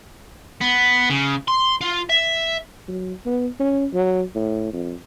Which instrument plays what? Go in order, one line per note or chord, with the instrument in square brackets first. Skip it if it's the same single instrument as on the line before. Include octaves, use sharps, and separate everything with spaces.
[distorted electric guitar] B3
C#3
C6
F4
E5
[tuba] F#3
B3
C#4
F#3
A2
F2